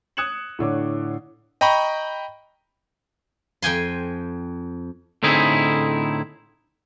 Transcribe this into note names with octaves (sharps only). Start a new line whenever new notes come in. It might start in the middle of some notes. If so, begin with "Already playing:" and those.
D#6 F#6 G#6 C#7 E7 F#7
A2 D3 C#5 D6
D#5 G5 A#5 B5 C#6
F2 G5 G#5 C6
A2 D3 C4 D#4 E4 G#4